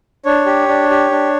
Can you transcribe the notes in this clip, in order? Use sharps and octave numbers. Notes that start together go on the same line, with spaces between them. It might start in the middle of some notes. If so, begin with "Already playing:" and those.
D4 C#5
G4
D4
G4
D4